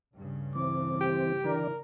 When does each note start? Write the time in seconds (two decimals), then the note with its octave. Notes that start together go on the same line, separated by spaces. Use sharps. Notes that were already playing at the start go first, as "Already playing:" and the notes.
0.14 D2 G2 C#3
0.55 E3 C4 D6
1.01 G4
1.45 D3 E3 A#4 D5